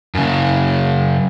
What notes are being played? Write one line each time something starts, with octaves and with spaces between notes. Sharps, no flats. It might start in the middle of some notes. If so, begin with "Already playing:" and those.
F#2 C#3